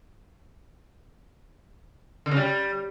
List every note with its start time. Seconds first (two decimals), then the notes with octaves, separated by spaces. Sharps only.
2.26 D3
2.31 C#3
2.37 G3